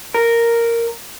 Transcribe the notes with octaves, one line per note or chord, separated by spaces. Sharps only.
A#4